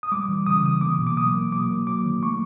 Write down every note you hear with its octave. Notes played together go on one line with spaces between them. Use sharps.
D#6
G3 D6
E3
C#3 D#6
E3 D#6
A#3 D6
B2
D6
F#3 D#6
A#3
F#3 D6
A#3
F#3 D6
D#3
A3 C#6